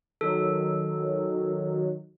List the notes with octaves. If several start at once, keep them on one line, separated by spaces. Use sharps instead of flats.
D#3 F#3 A4